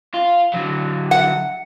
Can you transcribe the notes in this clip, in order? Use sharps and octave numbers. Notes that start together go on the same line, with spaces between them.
F4
D3 F#3
F#5